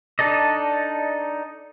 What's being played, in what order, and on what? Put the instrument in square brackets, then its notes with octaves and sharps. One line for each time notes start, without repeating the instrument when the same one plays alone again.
[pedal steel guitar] D4 D#4 A4 D5 D#5